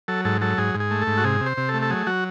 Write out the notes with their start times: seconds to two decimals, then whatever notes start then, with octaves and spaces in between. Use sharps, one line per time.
0.08 F#3 A4
0.25 G#2 A4
0.41 F#3 A4
0.58 G#2 G#4
0.74 G#2
0.80 G#4
0.91 A3
1.02 A4
1.07 G#2
1.17 F#4
1.24 C3 G#4
1.41 C3
1.46 C5
1.57 C3
1.69 A4
1.74 A3
1.82 A4
1.90 F#3 G#4
2.07 F#3 F#4